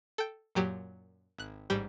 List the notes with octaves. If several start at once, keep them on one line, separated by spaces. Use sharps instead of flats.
A4 G5
F#2 A#2 F#3 G4
G#1 F#6
A1 G#2 G3 G4